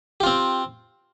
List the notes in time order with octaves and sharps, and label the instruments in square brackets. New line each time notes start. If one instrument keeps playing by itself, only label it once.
[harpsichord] G4
F4
C4